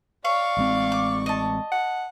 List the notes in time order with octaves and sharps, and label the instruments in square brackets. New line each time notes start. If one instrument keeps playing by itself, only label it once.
[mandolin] C#5 [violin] D5 C#6 [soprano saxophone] F5
[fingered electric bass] A1 G#3 C4
[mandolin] D6
D#5 A5
[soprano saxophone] F#5